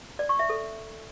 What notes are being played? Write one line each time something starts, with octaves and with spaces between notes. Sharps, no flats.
D5
C#6
E5
A4